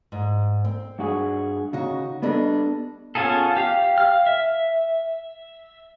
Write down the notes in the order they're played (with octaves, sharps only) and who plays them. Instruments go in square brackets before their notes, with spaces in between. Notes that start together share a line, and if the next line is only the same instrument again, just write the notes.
[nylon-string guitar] G#2
C4
[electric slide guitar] G2 F#4 G#4
[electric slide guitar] C#3 [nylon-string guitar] D#4 F#4
[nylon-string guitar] G3 D4 D#5 [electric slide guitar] B3 A4
[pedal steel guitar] B3 C#4 F4 G#4 A4
G4 F5
F5 F6
E5